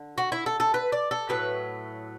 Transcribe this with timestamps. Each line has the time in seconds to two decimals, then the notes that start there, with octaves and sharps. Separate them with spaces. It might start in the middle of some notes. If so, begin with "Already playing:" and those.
Already playing: D3
0.18 F#4
0.32 E4
0.46 A4
0.60 A4
0.74 B4
0.92 D5
1.11 A4
1.29 A2 F#3 A3 B4